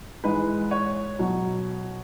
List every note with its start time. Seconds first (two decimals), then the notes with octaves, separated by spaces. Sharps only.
0.24 G#2 E3 G#3 B4
0.71 C#5
1.19 B2 F#3